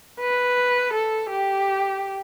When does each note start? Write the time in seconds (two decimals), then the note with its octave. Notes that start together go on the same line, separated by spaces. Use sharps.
0.21 B4
0.93 A4
1.30 G4